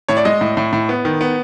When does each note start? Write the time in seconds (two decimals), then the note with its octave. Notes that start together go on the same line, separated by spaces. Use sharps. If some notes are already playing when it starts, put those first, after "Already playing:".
0.09 A2 C#5
0.17 D5
0.25 G#3 D#5
0.41 A2
0.57 A2
0.73 A2
0.89 B3
1.05 D#3
1.21 B3